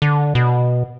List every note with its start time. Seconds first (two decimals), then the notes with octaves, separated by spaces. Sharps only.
0.02 D3
0.35 B2